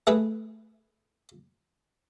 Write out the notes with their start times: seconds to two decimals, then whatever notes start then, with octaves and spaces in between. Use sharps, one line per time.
0.07 A3 G#4 B4